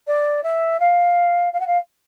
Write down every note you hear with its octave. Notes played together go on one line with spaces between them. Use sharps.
D5
E5
F5
F5
F#5
F5